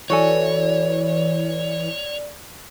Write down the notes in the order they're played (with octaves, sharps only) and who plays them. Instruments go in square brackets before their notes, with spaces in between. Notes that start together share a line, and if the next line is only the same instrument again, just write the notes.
[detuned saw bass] E3 [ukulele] F#4 A4 G#5 [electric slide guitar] C#5 [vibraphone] D5